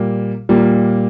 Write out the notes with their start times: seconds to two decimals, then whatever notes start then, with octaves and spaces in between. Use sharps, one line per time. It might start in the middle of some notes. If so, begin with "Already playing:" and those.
Already playing: A#2 G3 A#3
0.49 A#2 G3 A#3